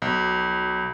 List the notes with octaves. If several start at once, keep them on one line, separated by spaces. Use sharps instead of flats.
B1